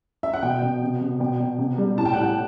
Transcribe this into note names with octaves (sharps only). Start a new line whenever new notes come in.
E5
F#5
B2 G5
B2
C3
C3
B2 G5
B2
C3
G3
A2 A5
G5
F#5
A2 G5